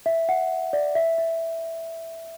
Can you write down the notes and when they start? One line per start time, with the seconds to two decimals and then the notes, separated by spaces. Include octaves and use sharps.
0.06 E5
0.29 F#5
0.73 D5
0.95 E5
1.18 E5